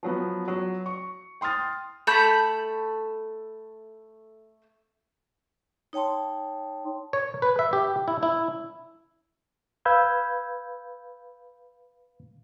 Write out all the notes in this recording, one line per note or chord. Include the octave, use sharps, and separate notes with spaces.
F3 F#3 B3
F#3
C#6
G5 C6 D#6 F6 A6
A3 A5 B5 G6
D#4 C#5 G5 A5 C6
C#5
B4
E5
G4
E4
E4
B4 F5 B5 E6 G6 G#6